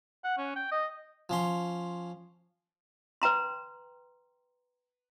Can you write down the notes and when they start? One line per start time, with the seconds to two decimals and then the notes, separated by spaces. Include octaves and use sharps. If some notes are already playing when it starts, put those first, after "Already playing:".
0.24 F#5
0.38 C#4
0.56 G5
0.72 D#5
1.29 F3 C#4 C6
3.22 B4 G5 A#5 C6